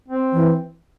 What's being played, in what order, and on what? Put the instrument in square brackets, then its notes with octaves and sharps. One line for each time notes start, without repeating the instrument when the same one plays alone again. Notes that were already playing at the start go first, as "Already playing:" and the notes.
[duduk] C4
[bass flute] E3